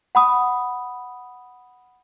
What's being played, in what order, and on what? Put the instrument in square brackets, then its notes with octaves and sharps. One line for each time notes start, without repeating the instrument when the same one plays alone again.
[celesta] F#5 B5 D#6